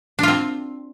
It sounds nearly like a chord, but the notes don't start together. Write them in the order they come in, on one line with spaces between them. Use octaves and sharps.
D4 F4 C4